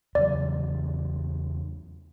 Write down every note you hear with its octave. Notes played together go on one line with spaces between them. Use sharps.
E2 C#3 F#3 D5